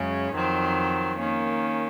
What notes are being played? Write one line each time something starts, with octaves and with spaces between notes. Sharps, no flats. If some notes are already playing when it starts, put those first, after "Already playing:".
Already playing: F#2 C#3 G#3 C#4
F2 D#3 F#3 C4
D#3 A#3 C#4